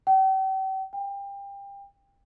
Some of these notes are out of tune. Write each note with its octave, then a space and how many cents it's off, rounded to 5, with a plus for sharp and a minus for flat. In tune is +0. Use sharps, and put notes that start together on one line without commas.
G5 -40
G5 +25